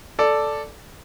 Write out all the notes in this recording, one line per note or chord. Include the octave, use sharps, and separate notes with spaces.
A4 D5